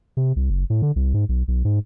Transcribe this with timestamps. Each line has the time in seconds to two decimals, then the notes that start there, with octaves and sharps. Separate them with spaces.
0.17 C3
0.36 C2
0.50 F#1
0.70 A2
0.82 D3
0.96 C2
1.14 G#2
1.29 B1
1.48 B1
1.65 G#2